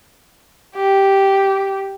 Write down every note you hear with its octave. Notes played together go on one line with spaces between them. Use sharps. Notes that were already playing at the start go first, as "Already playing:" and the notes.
G4